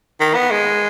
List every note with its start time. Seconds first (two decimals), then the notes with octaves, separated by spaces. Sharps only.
0.20 D#3
0.35 B3
0.51 G#3